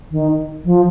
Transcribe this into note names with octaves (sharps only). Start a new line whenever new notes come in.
D#3
F3